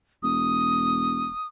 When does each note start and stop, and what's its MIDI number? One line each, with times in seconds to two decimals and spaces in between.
0.23 1.30 28
0.23 1.47 87